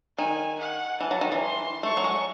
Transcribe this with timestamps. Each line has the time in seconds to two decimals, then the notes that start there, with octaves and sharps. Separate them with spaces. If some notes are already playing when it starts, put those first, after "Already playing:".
0.18 D#3 G#5
0.59 F#5
1.00 E3 A5
1.11 F#3
1.21 D#3
1.32 E3
1.42 C6
1.83 A3 C#6
1.97 F#3
2.04 G#3